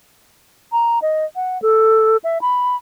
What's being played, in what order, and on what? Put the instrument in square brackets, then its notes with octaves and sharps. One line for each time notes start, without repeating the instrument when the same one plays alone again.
[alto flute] A#5
D#5
F#5
A4
E5
B5